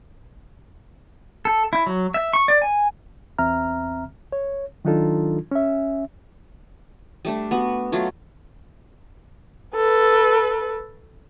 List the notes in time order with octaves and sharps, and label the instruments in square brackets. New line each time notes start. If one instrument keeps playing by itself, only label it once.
[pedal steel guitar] A4
E4
F#3
E5
C#6
D5
G#5
[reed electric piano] E2 C4 E5 A#5 F6
C#5
D#3 F#3 D4 D#4 F4 A4
C#4 E5
[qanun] G3 A3 D4
B3 F#4
F#3 A3 F4
[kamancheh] A4 B4